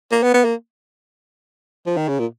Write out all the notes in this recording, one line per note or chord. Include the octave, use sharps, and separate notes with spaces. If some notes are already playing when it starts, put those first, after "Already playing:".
A#3
B3
B3
A#3
F3
D#3
C#3
A#2